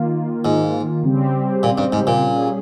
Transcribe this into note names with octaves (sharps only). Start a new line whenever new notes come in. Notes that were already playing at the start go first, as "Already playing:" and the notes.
Already playing: D#3 A#3 F4
G#2
C#3 G3 C4 G4
A#2
G2
G#2
A#2
G3 C#4 G#4